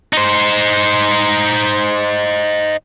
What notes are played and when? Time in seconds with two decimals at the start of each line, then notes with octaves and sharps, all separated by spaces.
0.13 D#4 C5